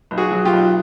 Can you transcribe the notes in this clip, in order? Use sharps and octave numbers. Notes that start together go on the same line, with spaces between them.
B1
F#4 G#4
F#3
F4 G4
B1